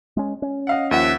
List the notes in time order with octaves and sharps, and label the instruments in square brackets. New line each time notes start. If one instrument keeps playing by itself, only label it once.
[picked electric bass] G#3 C#4
C#4
[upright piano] D#5 F5 F#5
[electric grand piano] D#2 F#5 [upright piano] F3 [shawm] E5